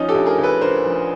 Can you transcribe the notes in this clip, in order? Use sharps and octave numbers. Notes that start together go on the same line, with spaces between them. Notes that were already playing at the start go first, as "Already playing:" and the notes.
Already playing: F3 C#4 D#4
G4 A4
D2
G#4 A#4
D2
A4 B4
D3 A#4 C5
F3